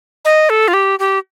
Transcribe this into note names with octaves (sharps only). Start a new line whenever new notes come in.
D#5
A4
F4
G4
G4